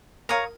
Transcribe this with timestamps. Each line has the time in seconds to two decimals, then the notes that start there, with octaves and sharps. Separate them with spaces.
0.29 A#4 C#5 F5 A#5 D#6